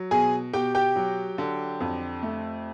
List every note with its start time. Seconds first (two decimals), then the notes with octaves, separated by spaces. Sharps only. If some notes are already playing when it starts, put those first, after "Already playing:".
Already playing: F#3
0.11 B2 G#4 G#5
0.53 B2 G4 G5
0.75 G4 G5
0.96 F#3
1.38 D3
1.80 F2
2.23 A3